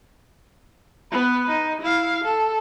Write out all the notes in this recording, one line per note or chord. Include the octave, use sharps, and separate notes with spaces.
B3 B4
D#4
E4 F5
A4